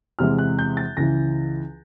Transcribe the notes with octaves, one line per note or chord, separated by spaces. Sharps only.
E2 C3 E3 G#3 F6
F#6
G6
A6
C#2 C#3 E3 A#6